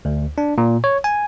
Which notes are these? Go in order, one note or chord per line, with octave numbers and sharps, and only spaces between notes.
D2
D4
A#2
C#5
G#5